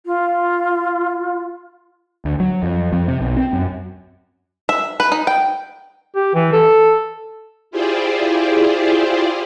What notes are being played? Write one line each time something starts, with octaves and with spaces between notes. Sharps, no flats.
F4
D2
F#3
F2
F2
C3
B1
C4
F#2
E5
B4
D#4
G5
G4
E3
A4
E4 F4 G4 G#4 C5 D5